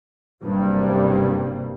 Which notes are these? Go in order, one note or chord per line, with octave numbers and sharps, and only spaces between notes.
F#1 G2 C3 G3 A#3